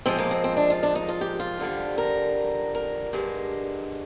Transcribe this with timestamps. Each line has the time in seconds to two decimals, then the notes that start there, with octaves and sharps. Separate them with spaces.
0.06 A#2 F3 G#3 C4
0.18 A#3
0.31 C4
0.44 C4
0.57 D4
0.70 F4
0.83 D4
0.95 D#4
1.09 F4
1.21 G4
1.40 F4
1.59 F2 D3 G3
1.98 A#4
2.75 A#4
3.13 G2 D3 G#3